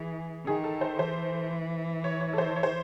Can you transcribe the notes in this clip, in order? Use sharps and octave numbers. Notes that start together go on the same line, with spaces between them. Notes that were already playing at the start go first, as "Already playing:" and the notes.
Already playing: E3 G#4
D#3 G#4
A4
C5
E3 C5
C#5
C#5
A4
C5
C#5
C5